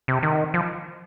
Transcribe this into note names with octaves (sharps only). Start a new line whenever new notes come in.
C3
D#3
F3